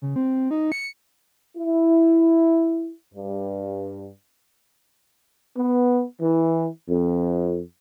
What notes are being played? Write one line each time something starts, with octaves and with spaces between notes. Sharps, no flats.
C#3
C4
D#4
C#7
E4
G2
B3
E3
F2